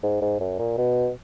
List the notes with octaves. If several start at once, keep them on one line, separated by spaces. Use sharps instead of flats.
G#2
G#2
F#2
A#2
B2